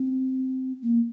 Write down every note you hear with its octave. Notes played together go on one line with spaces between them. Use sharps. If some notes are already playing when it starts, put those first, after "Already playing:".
Already playing: C4
A#3